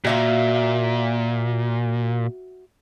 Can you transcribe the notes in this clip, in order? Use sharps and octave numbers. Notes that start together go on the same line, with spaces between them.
A#2 F#4 E5 F5